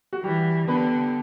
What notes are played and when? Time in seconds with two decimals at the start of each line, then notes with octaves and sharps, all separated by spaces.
0.13 F#4
0.24 E3 G3 G4
0.68 D3 B3 B4